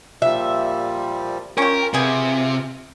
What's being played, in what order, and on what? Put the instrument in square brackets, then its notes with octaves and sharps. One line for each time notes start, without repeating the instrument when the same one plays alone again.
[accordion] A#2 F3 G3 [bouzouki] E5
[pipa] C#4 G4 [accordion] F4 [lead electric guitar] A#4
[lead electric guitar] C3 [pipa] B3 G#4